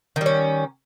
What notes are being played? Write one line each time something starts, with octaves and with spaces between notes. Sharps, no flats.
D#3 G3 C#4